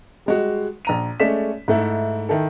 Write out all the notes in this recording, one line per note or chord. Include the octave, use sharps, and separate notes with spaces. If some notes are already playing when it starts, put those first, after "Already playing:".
G3 G#3 F#4
A#1 A#5 D#7
G#3 A3 C#4 D5 B6 E7
G#2 A3 E4
D#3 E4 A4